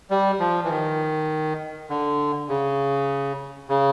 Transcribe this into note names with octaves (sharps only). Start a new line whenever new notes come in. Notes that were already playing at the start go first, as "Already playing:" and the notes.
G3
F3
E3
D#3
D3
C#3
C#3